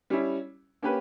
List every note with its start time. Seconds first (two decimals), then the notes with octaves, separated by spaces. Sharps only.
0.10 G3 C#4 E4
0.82 A#3 C#4 G4 B4